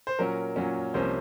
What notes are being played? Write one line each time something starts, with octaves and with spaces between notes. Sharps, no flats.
C5
A#2 F#3 C#4 A#4
A#2 F#3 C#4
C2 C3 F3 A#3 C#4 C5